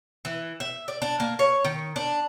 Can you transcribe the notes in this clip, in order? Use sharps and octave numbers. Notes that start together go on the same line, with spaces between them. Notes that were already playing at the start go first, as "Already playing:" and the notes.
E3
E5
D5
D4
A#3
C#5
D#3
D4